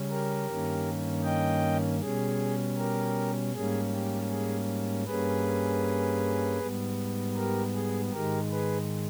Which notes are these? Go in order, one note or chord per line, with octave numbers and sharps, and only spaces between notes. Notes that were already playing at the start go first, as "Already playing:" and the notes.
Already playing: C#3 G3 C#4
G4 A#4
G2 D#3 A#3 C#4
D#5 G5
B2 G3 C#4 G#4
G4 A#4
G#2 G3 A#3 C#4 G#4
G4
G#4
G2 G3 A#3 C#4 G#4 B4
G#2 G3 B3
G4 A#4
G#4
G#2 D#3 G#3 G4 A#4
G#4 B4